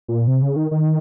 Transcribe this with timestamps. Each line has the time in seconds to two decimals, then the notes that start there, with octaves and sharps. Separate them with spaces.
0.08 A#2
0.27 C3
0.42 C#3
0.56 D#3
0.71 D#3